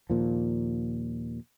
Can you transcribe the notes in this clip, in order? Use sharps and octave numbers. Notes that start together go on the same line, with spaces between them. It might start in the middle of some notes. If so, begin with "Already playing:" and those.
D#2 A#2 F3